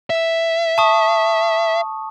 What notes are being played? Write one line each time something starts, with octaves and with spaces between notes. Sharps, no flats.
E5
A5 C#6 D#6